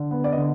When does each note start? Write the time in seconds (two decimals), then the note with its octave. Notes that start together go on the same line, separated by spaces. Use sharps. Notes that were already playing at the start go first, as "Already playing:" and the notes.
Already playing: D3
0.11 B3
0.24 D5
0.32 D#5
0.37 D3